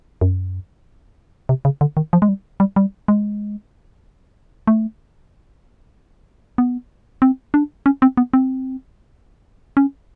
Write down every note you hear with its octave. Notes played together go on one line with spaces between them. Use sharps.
F#2
C3
C#3
D3
D#3
F3
G#3
G3
G3
G3
G#3
A3
B3
C4
D4
C#4
C4
B3
C4
C#4